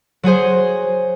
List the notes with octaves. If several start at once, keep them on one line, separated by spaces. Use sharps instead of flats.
F#3 F#4 G#4 C5